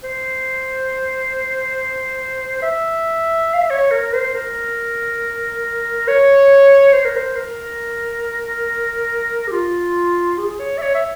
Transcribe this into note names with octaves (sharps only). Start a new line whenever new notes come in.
C5
E5
F5
E5
C#5
A#4
C5
A#4
C#5
C5
A#4
C5
A#4
G4
F4
G#4
C#5
E5
C#5
E5